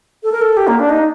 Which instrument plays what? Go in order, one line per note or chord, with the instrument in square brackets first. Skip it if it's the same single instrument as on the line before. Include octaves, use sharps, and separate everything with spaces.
[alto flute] A4
A#4
A4
G4
A#3
D4
D#4